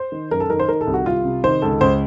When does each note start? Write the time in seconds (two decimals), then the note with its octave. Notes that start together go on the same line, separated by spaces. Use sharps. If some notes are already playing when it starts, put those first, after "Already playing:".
Already playing: C5
0.12 D#3
0.31 F#2 A#4
0.40 A4
0.50 D#3 A#4
0.59 C5
0.68 D#3 A#4
0.81 A4
0.87 C2
0.94 F#4
1.06 C2 F4
1.25 C3
1.44 D#3 C5
1.62 C#2 A4
1.81 C#2 C5